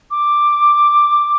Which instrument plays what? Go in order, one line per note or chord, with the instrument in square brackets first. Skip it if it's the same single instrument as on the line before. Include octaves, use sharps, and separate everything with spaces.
[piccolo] D6